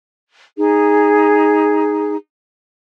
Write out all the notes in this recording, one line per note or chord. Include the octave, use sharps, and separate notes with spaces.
D#4 G#4